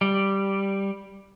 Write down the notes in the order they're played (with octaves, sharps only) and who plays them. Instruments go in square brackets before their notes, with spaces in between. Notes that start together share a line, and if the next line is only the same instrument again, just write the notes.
[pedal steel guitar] G3